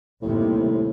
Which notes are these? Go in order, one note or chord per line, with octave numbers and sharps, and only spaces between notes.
D#2 A2 C3 G3